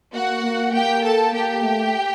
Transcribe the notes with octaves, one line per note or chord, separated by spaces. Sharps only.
A#3 F#4 F#5
A#3
A#3 G4 G5
A4 A5
A#3 G4 G5
A3